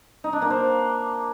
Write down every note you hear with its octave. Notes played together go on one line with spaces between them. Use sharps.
D#4
D4
A#3
C5